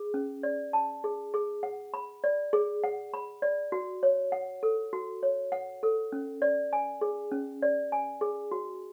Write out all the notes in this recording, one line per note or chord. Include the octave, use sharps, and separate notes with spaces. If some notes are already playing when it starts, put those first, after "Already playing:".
Already playing: G#4
C#4
D5
A5
G#4
G#4
F#5
B5
D5
G#4
F#5
B5
D5
F#4
C#5
F#5
A4
F#4
C#5
F#5
A4
C#4
D5
G#5
G#4
C#4
D5
G#5
G#4
F#4